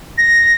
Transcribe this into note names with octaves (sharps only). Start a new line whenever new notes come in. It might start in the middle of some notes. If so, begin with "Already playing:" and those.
A#6